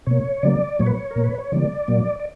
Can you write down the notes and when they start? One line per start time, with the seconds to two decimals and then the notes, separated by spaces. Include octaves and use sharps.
0.06 B2 A#3 C#5
0.43 C#3 F#3 A#3 D5
0.79 A#2 F#3 A#3 C#5
0.86 B4
0.94 C#5
1.11 A#4
1.16 A#2 A#3
1.24 B4
1.39 C#5
1.52 C#3 E3 G3 A#3 D5
1.88 A#2 F#3 A#3
2.19 D5